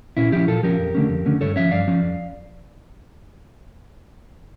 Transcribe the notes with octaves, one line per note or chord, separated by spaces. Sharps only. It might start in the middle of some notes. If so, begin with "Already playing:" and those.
A#2 C#4 E4
F3 C#4 E4 G4
A#2 F4 A4
F3 C#4 G4 A#4
F2
D3 A3 C#4
F2
D3 A3 C#4
G2 A4 C#5
F3 C#4 C#5 E5
G2 D5 F5
F3 C#4
F2